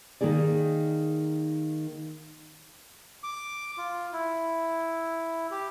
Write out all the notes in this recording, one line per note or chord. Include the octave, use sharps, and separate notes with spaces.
D#3 A#3 D#4 G#4 D5
D6
F4
E4
G4